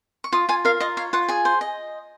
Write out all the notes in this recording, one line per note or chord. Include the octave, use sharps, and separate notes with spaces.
C#6
F4 D#6
F4 G#5
A#4 F5
F4 D#5
C#5 F5
F4 F#5
G#4 G#5
C5
D#5